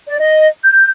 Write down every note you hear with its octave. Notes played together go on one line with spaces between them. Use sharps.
D5
D#5
G6